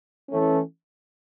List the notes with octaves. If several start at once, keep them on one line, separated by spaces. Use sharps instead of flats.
E3 A3 C#4